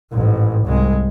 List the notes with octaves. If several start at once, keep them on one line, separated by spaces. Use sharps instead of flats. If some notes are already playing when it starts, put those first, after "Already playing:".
A1 G#2
C2 G#3